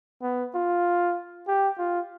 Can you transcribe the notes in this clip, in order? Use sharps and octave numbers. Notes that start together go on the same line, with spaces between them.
B3
F4
G4
F4